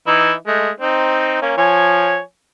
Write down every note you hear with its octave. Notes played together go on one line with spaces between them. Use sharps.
E3 D#4 E4
G#3 A3
C4 D#4
A#3 C#4
F3 C#5 G#5